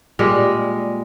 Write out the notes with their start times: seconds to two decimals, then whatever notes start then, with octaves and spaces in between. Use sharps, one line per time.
0.19 A#2 G3 G#3